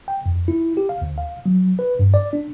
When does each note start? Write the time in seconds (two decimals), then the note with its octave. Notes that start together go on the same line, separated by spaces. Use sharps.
0.08 G5
0.26 F2
0.48 E4
0.77 G4
0.89 F5
1.02 D2
1.18 F5
1.46 F#3
1.79 B4
1.99 G2
2.14 D5
2.33 D4